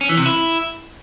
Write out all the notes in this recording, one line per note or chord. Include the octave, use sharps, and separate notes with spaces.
C#4
E3
C3
E4